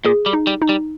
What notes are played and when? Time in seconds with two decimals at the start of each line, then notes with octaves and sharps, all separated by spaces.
0.05 A#2 G#4
0.26 G3
0.33 D#4
0.47 G3
0.62 D#4
0.69 G3